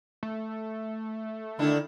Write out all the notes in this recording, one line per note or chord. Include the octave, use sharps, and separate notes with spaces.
A3
D3 D#3 D4 E4